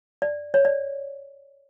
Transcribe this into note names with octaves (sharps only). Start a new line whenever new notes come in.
D5
C#5
D5